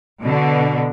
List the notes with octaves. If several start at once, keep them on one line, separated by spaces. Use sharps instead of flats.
B2 D3